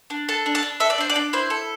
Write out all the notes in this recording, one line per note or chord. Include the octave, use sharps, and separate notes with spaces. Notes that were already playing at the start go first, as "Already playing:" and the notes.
D4
A4 A5
D4
A5
D4
A4 E5
D5
D4 C5
D5
D4
E4 C5
A4